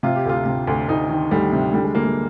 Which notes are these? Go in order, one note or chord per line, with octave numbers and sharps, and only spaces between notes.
C3 F4
G4
D2 F4
C3
D2
D2 D#4
D#3
D2 G3
C3
D3 G3
G#3
D3 A#3
G#3